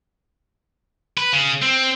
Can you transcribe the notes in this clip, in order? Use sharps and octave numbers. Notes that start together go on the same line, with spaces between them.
B4
C#3
C4